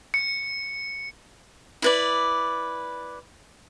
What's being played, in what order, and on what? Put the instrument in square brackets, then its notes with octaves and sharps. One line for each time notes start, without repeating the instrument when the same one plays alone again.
[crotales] C#7
[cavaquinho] E4 B4 D5